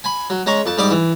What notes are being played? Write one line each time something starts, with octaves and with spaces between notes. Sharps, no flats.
G#5 B5
F#3
G#3 C#4 A#5 C#6
F2 A5
G#2 G3 D5 D6 D#6
E3